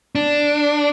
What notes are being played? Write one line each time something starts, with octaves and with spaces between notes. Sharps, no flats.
D4